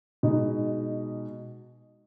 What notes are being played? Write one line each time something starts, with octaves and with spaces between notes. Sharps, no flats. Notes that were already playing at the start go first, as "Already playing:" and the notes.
B2 G#3 D#4